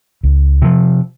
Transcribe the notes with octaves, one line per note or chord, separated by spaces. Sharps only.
C#2
C3 F3